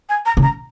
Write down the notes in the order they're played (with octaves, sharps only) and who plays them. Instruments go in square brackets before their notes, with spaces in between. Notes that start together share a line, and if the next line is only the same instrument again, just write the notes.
[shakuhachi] G#5
A#5
[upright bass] C#3
[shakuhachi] A#5